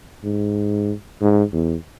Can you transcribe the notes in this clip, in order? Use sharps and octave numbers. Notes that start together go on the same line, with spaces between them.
G#2
G#2
E2